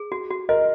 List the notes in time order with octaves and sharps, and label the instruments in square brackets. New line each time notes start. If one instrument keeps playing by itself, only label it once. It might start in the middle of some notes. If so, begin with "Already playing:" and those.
Already playing: [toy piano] G#4
F#4
F#4
[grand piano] A#4 [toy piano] D#5